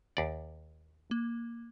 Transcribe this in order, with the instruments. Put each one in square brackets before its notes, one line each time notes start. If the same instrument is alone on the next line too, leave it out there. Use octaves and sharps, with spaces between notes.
[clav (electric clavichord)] D#2 D5
[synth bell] A#3